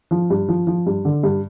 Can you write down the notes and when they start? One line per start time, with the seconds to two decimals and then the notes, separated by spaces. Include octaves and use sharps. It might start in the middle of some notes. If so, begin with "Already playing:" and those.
0.11 F3
0.30 G2
0.49 F3
0.67 F3
0.86 G2
1.05 D3
1.23 G2